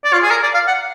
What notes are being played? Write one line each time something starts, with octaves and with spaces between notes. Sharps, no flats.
D5
F4
G#4
A#4
D5
F5
F#5